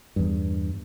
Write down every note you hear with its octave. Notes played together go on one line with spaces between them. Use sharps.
E2 G2